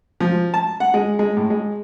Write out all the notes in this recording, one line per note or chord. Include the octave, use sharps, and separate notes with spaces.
F3
A5
F#5
G#3
G#3
A2
G#3